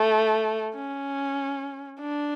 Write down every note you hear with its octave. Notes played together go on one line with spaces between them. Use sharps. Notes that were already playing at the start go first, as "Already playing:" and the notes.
Already playing: A3
C#4
D4